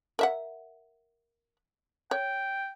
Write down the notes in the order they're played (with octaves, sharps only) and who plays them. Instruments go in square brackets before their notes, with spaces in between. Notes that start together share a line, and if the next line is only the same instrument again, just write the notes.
[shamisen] A#4 E5 F#5
[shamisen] C#5 [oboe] G5